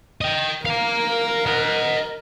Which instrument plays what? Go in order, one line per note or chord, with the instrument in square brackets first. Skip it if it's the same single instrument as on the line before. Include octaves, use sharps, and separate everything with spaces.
[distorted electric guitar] D#5 G5
[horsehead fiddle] A#4 [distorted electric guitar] F5 A#5
[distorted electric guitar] D#5 F#5